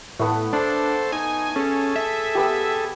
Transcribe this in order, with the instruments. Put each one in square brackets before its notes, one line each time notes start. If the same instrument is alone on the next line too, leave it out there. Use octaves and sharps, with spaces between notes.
[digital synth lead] A2 [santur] A3 B3 F#5
[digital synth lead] D4 [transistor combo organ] A4 C5
[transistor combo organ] D#4 [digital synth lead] G#5
[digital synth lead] C#4 [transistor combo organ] G#4 A4
[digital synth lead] E5
[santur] B3 G4